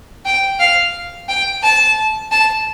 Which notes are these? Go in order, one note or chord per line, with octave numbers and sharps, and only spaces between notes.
G5
F5
G5
A5
A5